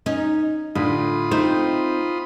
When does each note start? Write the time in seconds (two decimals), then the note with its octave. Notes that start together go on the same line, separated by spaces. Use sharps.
0.06 C#4 D#4
0.75 A2 D3 F4 B5 D#6
1.31 A3 C4 D#4